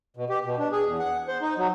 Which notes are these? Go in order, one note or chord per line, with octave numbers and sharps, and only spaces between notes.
B2
G4
B2
D4
G#4
E2
F#5
C5
D#4
F#3